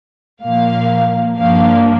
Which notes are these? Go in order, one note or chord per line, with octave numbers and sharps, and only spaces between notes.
A#2 F3 A#3 F5
G2 F3 A#3 D4 F5